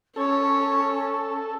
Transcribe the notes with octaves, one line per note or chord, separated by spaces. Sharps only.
C#4 A4 C#5